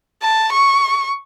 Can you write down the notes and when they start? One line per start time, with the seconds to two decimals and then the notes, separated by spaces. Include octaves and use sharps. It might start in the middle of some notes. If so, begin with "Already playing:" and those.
0.23 A5
0.52 C#6